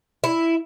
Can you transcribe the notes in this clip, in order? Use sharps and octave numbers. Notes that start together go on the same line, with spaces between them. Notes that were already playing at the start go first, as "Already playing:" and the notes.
E4